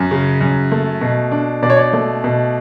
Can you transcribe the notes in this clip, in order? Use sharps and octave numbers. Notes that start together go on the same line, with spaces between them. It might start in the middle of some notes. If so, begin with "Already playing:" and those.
Already playing: F#2
C#3
F#2
A3
B2
D4
B2 D5
C#5
D5
A3
B2